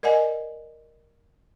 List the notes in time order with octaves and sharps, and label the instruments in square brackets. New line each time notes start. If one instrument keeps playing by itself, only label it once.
[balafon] A#4 D5 D#5 F#5 G#5